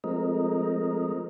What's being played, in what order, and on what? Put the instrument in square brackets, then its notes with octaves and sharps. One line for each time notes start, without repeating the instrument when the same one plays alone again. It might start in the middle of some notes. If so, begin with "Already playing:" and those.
[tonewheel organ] F3 G#3 A3 C4 A#4 D#5